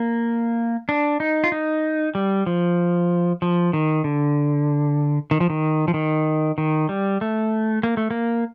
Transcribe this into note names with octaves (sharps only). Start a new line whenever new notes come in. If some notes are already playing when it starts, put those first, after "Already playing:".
Already playing: A#3
D4
D#4
F4
D#4
G3
F3
F3
D#3
D3
D#3
F3
D#3
F3
D#3
D#3
G3
A3
A#3
A3
A#3